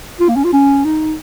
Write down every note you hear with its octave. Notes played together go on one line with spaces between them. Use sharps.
F4
A#3
C#4
F4
C#4
D#4